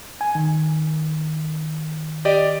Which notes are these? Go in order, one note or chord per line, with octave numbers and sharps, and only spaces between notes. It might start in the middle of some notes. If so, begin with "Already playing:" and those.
G#5
D#3
G4 D5 D#5